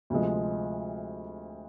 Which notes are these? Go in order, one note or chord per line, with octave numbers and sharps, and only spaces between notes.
D2 C3 F3 G#3